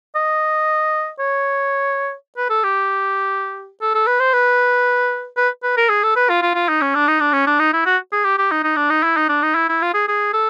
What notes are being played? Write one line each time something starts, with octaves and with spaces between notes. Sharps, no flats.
D#5
C#5
B4
A4
G4
A4
A4
B4
C5
B4
B4
B4
A#4
G#4
A4
B4
F4
F4
F4
D#4
C#4
D4
D#4
D4
C#4
D4
D#4
E4
F#4
G#4
G4
G4
D#4
D#4
D4
D#4
E4
D#4
D4
D#4
E4
E4
F4
G#4
G#4
A4